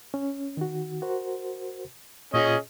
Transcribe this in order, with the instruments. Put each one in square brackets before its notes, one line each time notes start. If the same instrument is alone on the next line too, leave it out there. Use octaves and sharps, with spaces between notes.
[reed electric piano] C#4
D#3 F#4
F#4 A#4 C5
[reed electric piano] A#2 F4 [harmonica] C#4 G#4 D#5